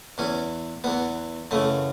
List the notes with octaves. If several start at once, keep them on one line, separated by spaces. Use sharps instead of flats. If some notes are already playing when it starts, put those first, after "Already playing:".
E2 E3 C#4
E2 E3 B3
F#2 C#3 E3 A3